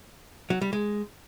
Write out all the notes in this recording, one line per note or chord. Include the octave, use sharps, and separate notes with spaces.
F#3
G3
G#3